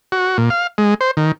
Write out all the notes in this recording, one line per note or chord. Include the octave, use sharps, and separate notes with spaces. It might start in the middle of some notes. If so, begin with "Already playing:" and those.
F#4
A#2
F5
G#3
C5
D#3